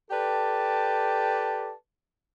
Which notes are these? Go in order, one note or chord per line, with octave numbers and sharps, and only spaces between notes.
G4 A4 B4 D5 G5 A5